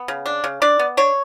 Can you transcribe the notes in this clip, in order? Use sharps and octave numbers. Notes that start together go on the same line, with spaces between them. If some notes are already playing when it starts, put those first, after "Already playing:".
Already playing: B3
C#3
D4
C#3
D4 D5
B3
D4 C#5